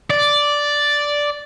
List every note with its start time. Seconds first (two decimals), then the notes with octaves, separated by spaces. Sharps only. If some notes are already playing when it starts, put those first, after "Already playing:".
0.10 D5